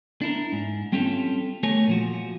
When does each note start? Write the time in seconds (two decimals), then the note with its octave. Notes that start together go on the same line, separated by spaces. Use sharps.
0.22 D4 E4 A#4
0.52 G#2
0.92 G3 C4 C#4 F4 G4 A4
1.63 A3 G4 A#4 C#5 G#5
1.88 A#2 F3 F#4